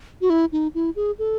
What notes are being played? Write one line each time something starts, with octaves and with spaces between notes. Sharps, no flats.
F#4
E4
D#4
E4
G#4
A4